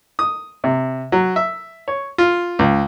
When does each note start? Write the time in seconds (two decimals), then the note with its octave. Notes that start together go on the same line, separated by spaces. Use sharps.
0.19 D#6
0.64 C3
1.12 F#3
1.36 E5
1.88 C#5
2.18 F4
2.59 C#2